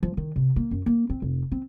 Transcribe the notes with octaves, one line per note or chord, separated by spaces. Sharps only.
F3
D#3
C3
A#3
F#2
A#3
C4
F1
C4